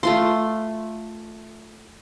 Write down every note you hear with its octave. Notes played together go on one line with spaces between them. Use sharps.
A3 F4 C6